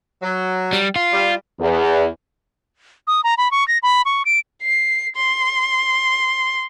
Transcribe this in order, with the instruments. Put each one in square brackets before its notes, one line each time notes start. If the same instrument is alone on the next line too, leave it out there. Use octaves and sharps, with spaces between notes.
[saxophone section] F#3
[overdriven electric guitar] G3
F4
[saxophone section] G3
[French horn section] E2
[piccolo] D#6
A#5
B5
C#6
A#6
B5
C#6
D7
[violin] C7
C6